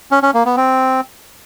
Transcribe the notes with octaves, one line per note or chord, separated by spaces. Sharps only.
C#4
C#4
A#3
B3
C4